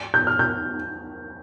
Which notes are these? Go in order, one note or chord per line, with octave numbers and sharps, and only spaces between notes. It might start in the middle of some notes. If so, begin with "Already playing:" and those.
G6
F6
G6